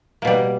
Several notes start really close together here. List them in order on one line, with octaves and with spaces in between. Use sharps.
A#3 B2 G3